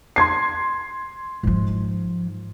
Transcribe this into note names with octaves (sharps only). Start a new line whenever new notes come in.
C6 G#6 C7
G#2 F3